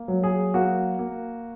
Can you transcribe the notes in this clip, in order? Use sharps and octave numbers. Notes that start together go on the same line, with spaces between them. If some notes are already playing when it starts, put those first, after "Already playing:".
Already playing: A#3
F#3
G#4
A#3 F#4
A#3